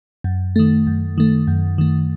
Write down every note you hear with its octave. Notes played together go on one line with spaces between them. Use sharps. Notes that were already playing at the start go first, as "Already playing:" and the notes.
F#2
D#3 A3
F#2
D#3 A3
F#2
D#3 A3